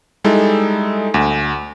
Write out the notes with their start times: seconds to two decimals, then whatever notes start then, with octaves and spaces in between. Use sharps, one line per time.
0.24 G3 G#3 D#4 E4 A4
1.14 D2